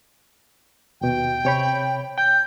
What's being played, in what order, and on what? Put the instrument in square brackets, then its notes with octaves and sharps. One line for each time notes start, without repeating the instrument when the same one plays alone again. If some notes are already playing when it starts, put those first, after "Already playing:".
[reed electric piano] D#2 B2 [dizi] G5
[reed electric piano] C3 C#5 B5
[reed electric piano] G5 [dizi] G6